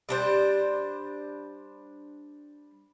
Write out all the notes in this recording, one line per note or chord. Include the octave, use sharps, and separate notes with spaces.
G3 D4 C5